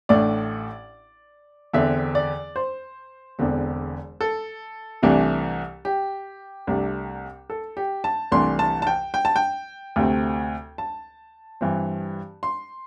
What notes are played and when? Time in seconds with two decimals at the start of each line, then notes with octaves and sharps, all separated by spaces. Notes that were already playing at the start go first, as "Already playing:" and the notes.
0.09 A1 A2 A3 D4 D5
1.73 E2 D3 C4 E5
2.15 D5
2.56 C5
3.39 E1 E2 D3 C4
4.21 A4
5.02 C2 C3 E3 A3 D4
5.85 G4
6.67 C2 C3 A3 D4
7.50 A4
7.77 G4
8.04 A5
8.31 C2 C3 E3 A3 D4 C6
8.59 A5
8.82 A5
8.87 G5
9.14 G5
9.25 A5
9.36 G5
9.96 D2 C3 A3 C4
10.78 A5
11.61 G2 E3 C4
12.43 C6